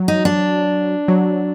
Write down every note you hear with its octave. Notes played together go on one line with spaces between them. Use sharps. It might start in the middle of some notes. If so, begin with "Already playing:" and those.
Already playing: F#3
D#4
D4
F#3